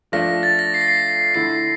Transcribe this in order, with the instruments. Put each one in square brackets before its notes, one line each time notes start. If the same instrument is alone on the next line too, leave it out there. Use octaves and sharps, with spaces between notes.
[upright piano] F3 A3 D4 F4 [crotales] A#6
[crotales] A6
A#6
C7
A#6
C7
[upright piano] D3 A3 E4 [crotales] C7